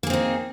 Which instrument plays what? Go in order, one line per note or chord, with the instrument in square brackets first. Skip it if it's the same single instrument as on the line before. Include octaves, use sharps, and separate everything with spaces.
[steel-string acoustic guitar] A#3
G#4
C4
D#4